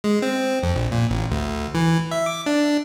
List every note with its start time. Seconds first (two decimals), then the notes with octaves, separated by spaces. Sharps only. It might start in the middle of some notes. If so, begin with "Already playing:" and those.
0.04 G#3
0.22 C4
0.63 F2
0.76 A#1
0.92 A#2
1.10 A1
1.31 D2
1.75 E3
2.11 E5
2.26 D6
2.46 D4